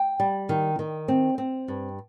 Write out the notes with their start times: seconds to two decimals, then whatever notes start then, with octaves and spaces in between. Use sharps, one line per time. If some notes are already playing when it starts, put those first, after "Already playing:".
Already playing: G5
0.20 G3
0.49 D#3
0.79 D#3
1.08 C4
1.38 C4
1.68 G2